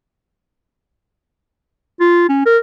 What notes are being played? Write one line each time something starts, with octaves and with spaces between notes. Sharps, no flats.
F4
C#4
A#4